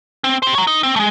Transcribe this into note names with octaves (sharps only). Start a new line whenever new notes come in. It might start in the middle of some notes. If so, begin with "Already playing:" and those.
C4
G4 C5
C#5 A#5
D#4
C4
G#3 A3